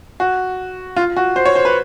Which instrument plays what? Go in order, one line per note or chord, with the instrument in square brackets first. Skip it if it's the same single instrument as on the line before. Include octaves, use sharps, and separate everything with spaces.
[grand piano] F#4
F4
F#4
C5
C#5
C5
B4